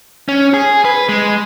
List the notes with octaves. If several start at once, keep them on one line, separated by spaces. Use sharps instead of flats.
C#4
G#4
B4
G#3